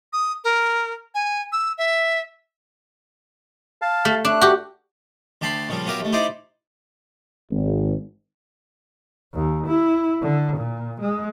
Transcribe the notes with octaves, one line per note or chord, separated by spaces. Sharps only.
D#6
A#4
G#5
E6
E5
F5 A5
A3
A3 D4 F#6
F#4 G4
D2 G4 A5 B5 C6
A#2 C#3 F3 G3
F#3 B3 F4 G4 A#4 E5
D#2 A3
D#4 E4 G4 C5 D5
G#1
D#2
E4
D3
A#2
G#3